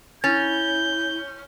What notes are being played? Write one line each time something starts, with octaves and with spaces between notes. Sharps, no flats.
C#4 E4 G6 A6